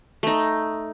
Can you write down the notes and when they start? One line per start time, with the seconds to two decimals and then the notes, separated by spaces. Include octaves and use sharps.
0.23 A3 D#4